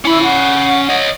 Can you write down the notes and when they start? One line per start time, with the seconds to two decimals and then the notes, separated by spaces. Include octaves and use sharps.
0.05 C#4 E4 B5
0.22 F#5
0.89 C#5 D#5